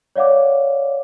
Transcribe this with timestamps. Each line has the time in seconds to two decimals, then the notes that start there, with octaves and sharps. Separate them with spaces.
0.16 C#5 D5 F5 F#5 D6